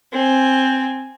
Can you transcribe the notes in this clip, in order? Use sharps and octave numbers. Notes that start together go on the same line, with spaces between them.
C4 G#5